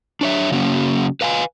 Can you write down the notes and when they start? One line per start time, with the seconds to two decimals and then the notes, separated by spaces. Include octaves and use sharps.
0.21 D4 C#5 E5
0.52 C#3 F#3 A#3 C#4
1.21 B4 F5 F#5 G#5